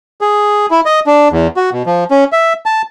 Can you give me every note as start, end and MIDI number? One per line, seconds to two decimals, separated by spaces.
0.21 0.66 68
0.71 0.81 64
0.86 1.00 75
1.06 1.28 62
1.32 1.47 40
1.57 1.70 66
1.72 1.83 47
1.86 2.04 53
2.11 2.24 61
2.32 2.53 76
2.66 2.82 81